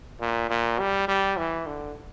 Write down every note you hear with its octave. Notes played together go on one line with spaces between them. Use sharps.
A#2
A#2
G3
G3
E3
D3